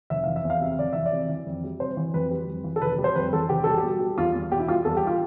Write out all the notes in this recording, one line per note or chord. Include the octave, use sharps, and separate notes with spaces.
F1 E5
E3 F5
E5
E2
F5
C3 E5
F1 D5
E3 E5
D5
C3
E3
F2
G3
C3 C5
E3
F2 B4
G3
F2
E3
A4
F1 B4
G3
C5
F2 B4
E3 A4
F1 G4
G3 A4
G4
B2
G3
E2 F4
E2
B2 G4
E4
G3 F4
E2 A4
G4
F4